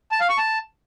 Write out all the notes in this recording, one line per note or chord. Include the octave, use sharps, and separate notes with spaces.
A5
F5
C#6
A5